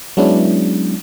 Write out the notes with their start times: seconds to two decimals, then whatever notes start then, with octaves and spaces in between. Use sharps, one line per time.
0.17 F#3 G#3 B3 C#4 D4 E4